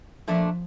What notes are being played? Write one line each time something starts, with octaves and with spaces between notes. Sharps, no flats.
A#2 F3 A3 D4